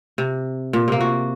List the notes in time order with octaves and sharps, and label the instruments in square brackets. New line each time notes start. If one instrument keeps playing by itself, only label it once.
[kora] C3
A#2
C3 A#3
F#4